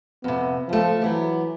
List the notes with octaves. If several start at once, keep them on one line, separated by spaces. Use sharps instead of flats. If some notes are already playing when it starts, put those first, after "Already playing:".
F2 C3 B3
C#3 F3 A3
E3 F#3 B3 G4